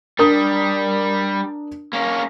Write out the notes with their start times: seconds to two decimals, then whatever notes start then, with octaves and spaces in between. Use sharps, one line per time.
0.19 G3 D4 A#4 D#6
1.93 A#3 C#4